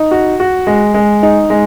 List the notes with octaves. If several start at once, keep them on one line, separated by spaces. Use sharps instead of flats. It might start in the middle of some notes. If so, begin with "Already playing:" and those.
Already playing: D#4
F#4
F#4
G#3
G#3
D#4
G#3